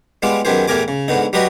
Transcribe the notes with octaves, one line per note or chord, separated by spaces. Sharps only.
G3 G#3 B3 F4 D6
F#2 D#3 B3 G4 G#4 C5
E2 A2 G4 A#4 G#5 D6
C#3
G#2 D3 B3 D#4
F#3 G3 F#4 G4 B4 D#5